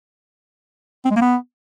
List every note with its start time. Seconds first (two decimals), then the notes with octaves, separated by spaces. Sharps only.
1.05 C4
1.11 G#3
1.16 A#3
1.21 B3